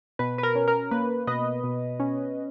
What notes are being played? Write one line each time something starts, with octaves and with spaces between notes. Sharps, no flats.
B2 B4
B4
A#4
C#4
A#4
A#3 B4
B2 B4 D#5
B2
C#4